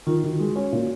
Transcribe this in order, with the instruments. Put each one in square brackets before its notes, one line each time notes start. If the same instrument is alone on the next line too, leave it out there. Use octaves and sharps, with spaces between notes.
[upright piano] D#3 [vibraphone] F4
[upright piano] D#3 [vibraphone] F#4
[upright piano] G#3
C#4
A#2